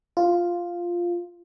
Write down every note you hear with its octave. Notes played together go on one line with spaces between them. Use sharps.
F4